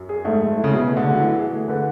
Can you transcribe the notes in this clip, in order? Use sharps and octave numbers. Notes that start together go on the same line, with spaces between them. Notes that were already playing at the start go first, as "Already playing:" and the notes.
Already playing: F#2
G#4
G#2 A3
A3
E4
C#3
B2 G#4
A3
D3
A3
F#3
E3 E4
G#4
A3
D3 B4